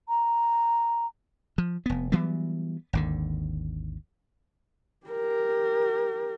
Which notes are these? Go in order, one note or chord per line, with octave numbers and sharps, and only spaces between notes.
A#5
F3
F1 B3
E3 F#3 G3 B3
G#1 D#2 D3
G4 A#4